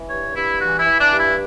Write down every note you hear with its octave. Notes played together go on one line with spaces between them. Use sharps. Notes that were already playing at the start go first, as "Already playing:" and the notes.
Already playing: E3
G2 C#5
G2 E4
E3 F#4
E4
E3
D4
G2
E4